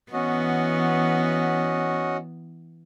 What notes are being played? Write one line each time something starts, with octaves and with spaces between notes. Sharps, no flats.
E3 B3 C#4 F#4 D#5